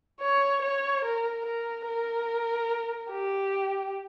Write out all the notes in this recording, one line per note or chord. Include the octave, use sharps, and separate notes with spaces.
C#5
C#5
A#4
A#4
A#4
G4